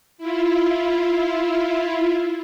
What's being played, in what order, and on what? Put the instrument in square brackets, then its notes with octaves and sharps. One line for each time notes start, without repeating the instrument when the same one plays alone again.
[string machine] E4 F4